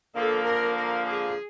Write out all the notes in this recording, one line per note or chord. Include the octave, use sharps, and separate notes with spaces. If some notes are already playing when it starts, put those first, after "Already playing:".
D3 F3 A#3 A4
A#4
A#4
G#4